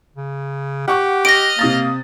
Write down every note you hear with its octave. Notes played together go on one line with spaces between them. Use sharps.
C#3
G4 F#5 C#6 F#6
D#5 F6 A#6 D7
C3 A#3 D#6 A6